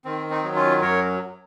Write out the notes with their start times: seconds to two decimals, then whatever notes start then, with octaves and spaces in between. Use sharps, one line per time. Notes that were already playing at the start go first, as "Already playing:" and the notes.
0.05 D#3 C4
0.30 C4 D#4
0.43 F#3
0.56 C#4 F4
0.81 F#2 A#4 C#5